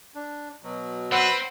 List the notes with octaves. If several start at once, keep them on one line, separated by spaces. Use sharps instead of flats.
D4
B2 F#3
C4 B4 C5 F#5 E6